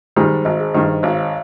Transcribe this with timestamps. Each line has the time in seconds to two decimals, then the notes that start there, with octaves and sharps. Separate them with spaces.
0.16 G#2 D#3 G3 G#4 C5
0.45 G#1 C5 D#5
0.60 G#4
0.74 G2 D#3 C5 D#5
0.88 C5 D#5
1.03 G#1 C#5 F5